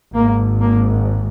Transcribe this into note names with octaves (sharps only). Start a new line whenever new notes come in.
G#1 G#2 A#3
A#3